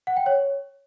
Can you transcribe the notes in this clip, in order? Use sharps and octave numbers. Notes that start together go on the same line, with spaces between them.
F#5
G5
C#5